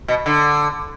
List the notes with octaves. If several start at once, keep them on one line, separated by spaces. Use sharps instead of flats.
B2
D3